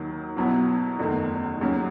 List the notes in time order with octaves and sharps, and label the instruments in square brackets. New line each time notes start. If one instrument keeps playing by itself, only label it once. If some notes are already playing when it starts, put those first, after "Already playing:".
Already playing: [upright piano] D#2 D#3 F#3
B1 B2 F#3 B3 E4
F#1 E2 D#3 A3
D#2 C#3 F#3 C#4